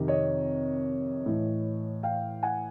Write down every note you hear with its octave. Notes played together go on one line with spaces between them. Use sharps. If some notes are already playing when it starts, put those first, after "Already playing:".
Already playing: F2 C3 D#3
C#5 D#5
A2 E3
F5 G5
F#5 G#5